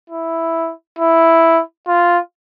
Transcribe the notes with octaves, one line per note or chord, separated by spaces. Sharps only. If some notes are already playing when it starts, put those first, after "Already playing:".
E4
E4
F4